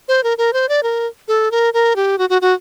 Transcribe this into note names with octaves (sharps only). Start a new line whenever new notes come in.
C5
A#4
A#4
C5
D5
A#4
A4
A#4
A#4
G4
F#4
F#4
F#4